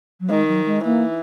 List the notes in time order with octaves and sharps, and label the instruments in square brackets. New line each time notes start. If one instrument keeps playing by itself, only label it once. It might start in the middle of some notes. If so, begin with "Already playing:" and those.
[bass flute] F#3
[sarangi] D#3 [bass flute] G#3
[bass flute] F#3
G#3
[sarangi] E3 [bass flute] A#3